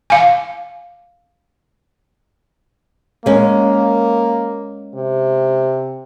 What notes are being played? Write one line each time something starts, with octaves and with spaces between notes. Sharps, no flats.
F5 G#5
G#3 A#3 C#4
C3